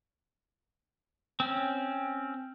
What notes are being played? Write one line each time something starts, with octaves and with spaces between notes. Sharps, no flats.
C4 C#4